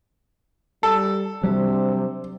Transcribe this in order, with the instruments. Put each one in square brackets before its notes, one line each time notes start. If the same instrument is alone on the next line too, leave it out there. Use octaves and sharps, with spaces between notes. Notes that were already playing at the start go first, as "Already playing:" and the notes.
[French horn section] G3 [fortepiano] A4
[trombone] C3 [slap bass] F#3 G3 [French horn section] D4 C5